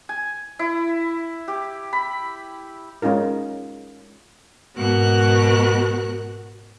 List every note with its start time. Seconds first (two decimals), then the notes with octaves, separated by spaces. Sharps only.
0.09 G#5
0.59 E4
1.48 G4
1.93 B5
3.02 G#3 C#4 D#4 F4 A#4
4.76 G#2 B2 F#4 A#4 F#6